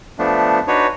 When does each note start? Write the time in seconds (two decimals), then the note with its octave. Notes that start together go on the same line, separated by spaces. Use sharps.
0.19 F3 A3 B3 D4
0.68 D4 D#4 F#4 B4 C#5